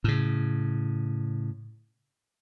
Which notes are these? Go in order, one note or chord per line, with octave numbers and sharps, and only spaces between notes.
A2 C#3